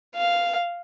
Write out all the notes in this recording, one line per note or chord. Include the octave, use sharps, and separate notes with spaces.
F5